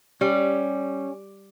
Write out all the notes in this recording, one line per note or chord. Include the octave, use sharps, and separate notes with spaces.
G3 C#4